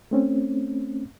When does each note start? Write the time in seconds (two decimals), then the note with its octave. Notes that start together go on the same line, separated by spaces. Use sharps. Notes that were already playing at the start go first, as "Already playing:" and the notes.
0.11 A3 C4 C#4